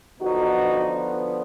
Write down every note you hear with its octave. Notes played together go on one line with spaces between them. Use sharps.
D3 F3 B3 D#4 F#4